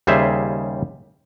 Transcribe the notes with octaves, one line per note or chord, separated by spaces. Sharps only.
D#2 C#3 G3 G#4 C5 E5